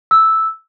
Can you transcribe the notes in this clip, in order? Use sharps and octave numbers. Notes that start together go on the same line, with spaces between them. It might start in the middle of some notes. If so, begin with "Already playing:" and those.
E6